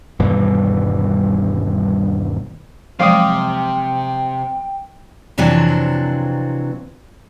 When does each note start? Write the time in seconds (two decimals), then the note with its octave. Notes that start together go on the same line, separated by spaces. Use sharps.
0.19 D#1 G2 B2 E3
2.99 C3 F3 F#3 G#3 F5 G5 D6 D#6
5.38 F2 C3 E3 F#3 C4 D4